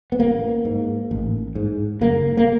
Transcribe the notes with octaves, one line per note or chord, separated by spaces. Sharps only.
B3
A1 A#3
G#2
A1
G#2
F#1 A#3
A#3